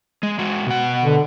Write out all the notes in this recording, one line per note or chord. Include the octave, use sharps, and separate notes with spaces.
G#3
G#3 F#4
B2 F#5
D3